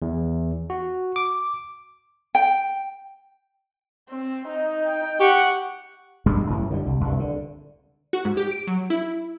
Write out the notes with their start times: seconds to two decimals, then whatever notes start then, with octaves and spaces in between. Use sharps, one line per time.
0.02 E2
0.70 F#4
1.16 D6
2.35 G5
4.09 C4
4.48 D#4
4.86 G5
5.20 G4 F#5 C#6
6.26 E1 G2 G3 G#3
6.50 F#2 A2 E3
6.71 D3 D#3 G3
6.86 C2
7.01 C2 G2
7.20 D3
8.13 F#4
8.25 G#2
8.37 G4
8.51 D7
8.67 F#3
8.90 E4